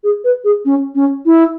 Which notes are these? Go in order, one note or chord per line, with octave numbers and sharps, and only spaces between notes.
G#4
B4
G#4
C#4
C#4
E4